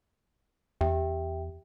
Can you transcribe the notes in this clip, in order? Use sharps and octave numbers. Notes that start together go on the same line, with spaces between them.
E2 G4 E5 G5